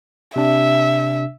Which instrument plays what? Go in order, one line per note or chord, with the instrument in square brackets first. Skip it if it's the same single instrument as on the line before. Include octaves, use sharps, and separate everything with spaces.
[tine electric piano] C3 D4 [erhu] E5